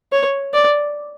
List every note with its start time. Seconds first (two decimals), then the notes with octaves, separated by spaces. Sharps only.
0.12 C#5
0.54 D5